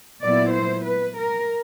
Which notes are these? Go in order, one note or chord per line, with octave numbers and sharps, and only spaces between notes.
A#2 F#3 B3 E4 D5
C5
B4
A#4